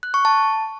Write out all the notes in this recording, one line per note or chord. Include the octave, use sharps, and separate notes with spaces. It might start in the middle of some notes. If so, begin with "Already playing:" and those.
F#6
C#6
A5